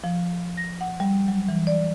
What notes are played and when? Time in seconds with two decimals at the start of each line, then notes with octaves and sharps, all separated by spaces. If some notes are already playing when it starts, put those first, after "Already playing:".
0.04 F3
0.57 A#6
0.81 F#5
1.00 G3
1.28 F#3
1.49 E3
1.67 D5